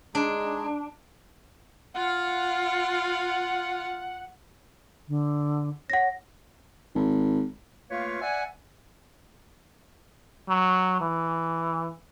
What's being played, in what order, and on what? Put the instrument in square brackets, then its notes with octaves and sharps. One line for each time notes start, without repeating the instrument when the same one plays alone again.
[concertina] G#3 D#4 G#4 [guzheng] D4
[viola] F4 F5 [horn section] F#5
[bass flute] D3
[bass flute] C#5 [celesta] F#5 A#6
[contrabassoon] G#1
[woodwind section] A3 A#3 F4 B4 C#5 F5
D5 E5 F#5 G#5
[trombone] F#3
E3